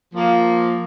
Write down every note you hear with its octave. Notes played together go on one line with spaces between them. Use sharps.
F3 A#3